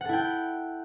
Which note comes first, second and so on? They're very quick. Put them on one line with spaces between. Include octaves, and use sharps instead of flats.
F#5 A4 E4 G5